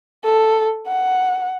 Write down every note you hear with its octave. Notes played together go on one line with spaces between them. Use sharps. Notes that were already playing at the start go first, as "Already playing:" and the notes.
A4
F#5